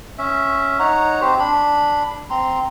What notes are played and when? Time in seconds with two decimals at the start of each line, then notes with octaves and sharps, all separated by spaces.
0.18 C#4 E5
0.79 D#4 C#5 F#5 A#5
1.21 C4 G4 C5
1.39 D4 B5
2.30 C4 A#5 C6